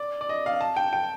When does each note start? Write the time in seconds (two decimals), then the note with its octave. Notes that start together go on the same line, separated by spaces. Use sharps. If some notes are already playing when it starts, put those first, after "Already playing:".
Already playing: D5
0.21 D5
0.29 D#5
0.46 F5
0.61 A5
0.76 G5
0.93 G5